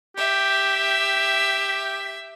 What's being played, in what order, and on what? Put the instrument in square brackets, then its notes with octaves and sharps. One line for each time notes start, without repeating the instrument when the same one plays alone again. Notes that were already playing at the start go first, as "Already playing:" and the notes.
[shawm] G4 [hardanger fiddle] E5